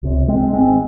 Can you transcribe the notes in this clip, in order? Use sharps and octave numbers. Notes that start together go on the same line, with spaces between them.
C#2 C3
G#3 C4
G#1 G#2 G#3 C4